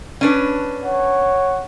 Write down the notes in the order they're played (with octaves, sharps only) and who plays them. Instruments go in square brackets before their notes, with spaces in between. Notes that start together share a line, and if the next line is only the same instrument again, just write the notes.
[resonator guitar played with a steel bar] C#4 D4 B4
[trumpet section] C#5 F#5